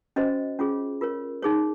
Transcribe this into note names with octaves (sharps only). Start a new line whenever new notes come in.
C#4 F#4 C5 D#5
C#4 F4 G#4 C#5
F4 A#4 C#5
D#4 G#4 C#5